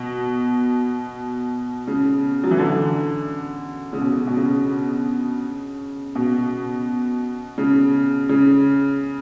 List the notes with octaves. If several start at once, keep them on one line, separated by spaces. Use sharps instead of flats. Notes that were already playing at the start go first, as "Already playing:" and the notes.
Already playing: B2
C#3
F#3
E3
D3
C#3
B2
B2
C#3
B2
C#3
C#3